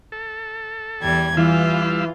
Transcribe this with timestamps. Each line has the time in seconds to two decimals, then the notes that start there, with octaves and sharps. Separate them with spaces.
0.12 A4
1.01 E2 G3 G#6
1.37 E3 G3 F4 F5 E6